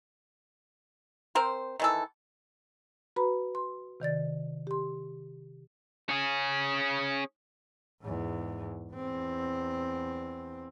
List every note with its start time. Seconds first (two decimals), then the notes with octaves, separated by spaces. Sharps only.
1.35 C4 A#4 C5
1.80 D#3 E3 A4
3.16 F#4 B4 A#5 B5
3.55 C6
4.00 C3 D#3 D5 A6
4.67 G4 C6
6.09 C#4 G#4
8.01 E2 G#2
8.92 E2 C4